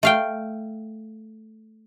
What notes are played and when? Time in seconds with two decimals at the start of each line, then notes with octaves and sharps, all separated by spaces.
0.03 A3 F5 G5